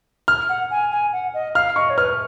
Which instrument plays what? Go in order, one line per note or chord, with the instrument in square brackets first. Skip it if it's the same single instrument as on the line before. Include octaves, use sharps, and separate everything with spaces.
[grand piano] F6
[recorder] F#5
G#5
G#5
F#5
D#5
[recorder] F5 [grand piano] F6
[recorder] D#5 [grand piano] C#6
[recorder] C#5
[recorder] B4 [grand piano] F6